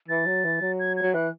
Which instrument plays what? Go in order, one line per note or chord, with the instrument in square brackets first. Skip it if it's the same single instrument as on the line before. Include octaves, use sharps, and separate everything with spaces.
[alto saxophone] E3 [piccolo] A6
[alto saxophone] F#3
E3
F#3
[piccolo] G#6
G#6
[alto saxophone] F#3
[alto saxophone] E3 [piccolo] F#6